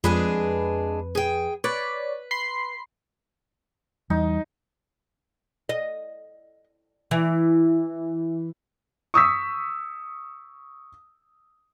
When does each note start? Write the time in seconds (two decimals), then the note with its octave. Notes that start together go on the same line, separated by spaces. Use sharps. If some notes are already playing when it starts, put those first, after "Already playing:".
0.04 F2 G#3 D4 G#4 B4
1.15 G#4 G5
1.64 B4 C#5 D5
2.31 B5 C6 C7
4.10 E2 G3 D#4
5.69 D#5
7.11 E3
9.14 C#6 D#6 E6 B6